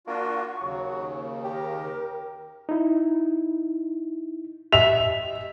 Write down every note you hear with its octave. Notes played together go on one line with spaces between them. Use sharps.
A#3 D4 F4 F#4 C#6
D#2 C#3 F#3
G4 A#4
D#4 E4
G4 D#5 E5 F7